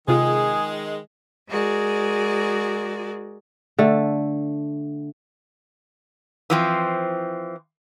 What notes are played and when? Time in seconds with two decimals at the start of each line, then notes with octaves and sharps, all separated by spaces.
0.08 C3 D#3 G#3 F4 G#4 D#6
1.48 G#3 F#4 G#4 A#4 D5
3.78 D3 A3
6.50 E3 F3 C4